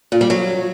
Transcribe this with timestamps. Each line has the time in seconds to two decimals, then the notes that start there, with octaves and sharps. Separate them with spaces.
0.12 A#2
0.21 G3
0.30 F#3